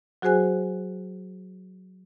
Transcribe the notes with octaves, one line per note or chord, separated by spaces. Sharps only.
F#3 F#4 G#4 C5 G#5 F#6